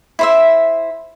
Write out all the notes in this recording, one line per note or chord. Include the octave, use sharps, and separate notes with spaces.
E4 C5 E5